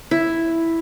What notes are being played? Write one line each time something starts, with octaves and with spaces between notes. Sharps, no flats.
E4